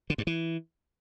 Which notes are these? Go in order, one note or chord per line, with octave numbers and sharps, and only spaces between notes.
D3
G2
E3